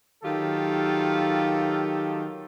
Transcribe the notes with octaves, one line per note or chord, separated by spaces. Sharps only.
D#3 F#3 F4 G4 A4